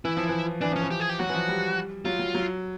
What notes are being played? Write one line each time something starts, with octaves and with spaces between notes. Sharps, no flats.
E3 E4
F3
E3
E3 D4
F3 C#4
E3
G4
G#4
G4
F#3 F#4
E3
F3
G3
F#3 F4
F#3
F#3